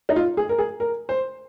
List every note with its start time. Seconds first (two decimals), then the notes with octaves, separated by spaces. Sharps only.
0.09 D#4
0.16 F4
0.37 G#4
0.49 A#4
0.58 G#4
0.80 A#4
1.09 C5